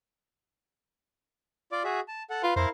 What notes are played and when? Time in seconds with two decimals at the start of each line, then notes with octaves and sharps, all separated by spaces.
1.72 F4 D5 D6
1.84 F#4 G#4 E5
2.08 A5
2.30 A4 F#5
2.43 F4 B4
2.56 F2 E4 A#4 C5 F5